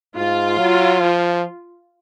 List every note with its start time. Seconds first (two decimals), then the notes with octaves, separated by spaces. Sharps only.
0.17 G#2 F4
0.59 F#3
1.01 F3